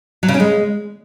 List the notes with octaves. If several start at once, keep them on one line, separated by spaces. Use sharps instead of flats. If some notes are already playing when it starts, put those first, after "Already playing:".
F#3
C#3
C#4
G#3